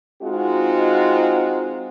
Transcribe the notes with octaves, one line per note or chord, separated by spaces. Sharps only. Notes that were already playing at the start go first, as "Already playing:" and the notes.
G#3 C4 D#4 F4 F#4